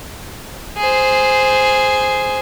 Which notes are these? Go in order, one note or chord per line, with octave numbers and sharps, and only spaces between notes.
G#4 C5